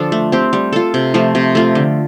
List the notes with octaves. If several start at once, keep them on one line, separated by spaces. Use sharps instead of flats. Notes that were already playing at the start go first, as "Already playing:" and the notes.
Already playing: D3 F3 D4 F4 A4
A3
C4 G4
G3
F4 A4
C3
F3 A3 F4
C3
A3 F4
D3